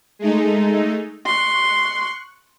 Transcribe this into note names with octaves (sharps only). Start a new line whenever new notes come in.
G#3 A3 D#4
C6 C#6 F#6